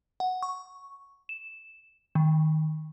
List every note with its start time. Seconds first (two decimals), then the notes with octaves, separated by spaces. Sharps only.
0.20 F#5
0.43 C#6
1.29 E7
2.15 D#3